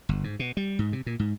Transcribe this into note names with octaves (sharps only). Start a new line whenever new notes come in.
G1
G#2
B2
G3
G#2
C3
A#2
G#2